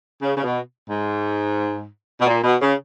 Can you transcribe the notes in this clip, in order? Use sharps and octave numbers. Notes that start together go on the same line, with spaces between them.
C#3
C#3
B2
G#2
B2
A#2
B2
C#3